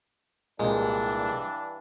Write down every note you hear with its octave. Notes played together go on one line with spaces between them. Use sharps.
C2 G2 A#2 E3 G#3 D4